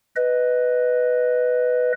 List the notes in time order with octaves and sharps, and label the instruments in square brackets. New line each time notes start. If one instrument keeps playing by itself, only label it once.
[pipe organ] B4 D#5